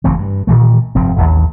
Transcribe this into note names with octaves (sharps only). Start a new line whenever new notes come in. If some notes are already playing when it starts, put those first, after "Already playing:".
F#1 E3 A3 C4
G2
A#2 D#3 E3 A3
F1 G2 F3 C4
E1 A1 D#2